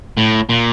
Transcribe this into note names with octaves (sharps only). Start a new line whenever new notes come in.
A2
A#2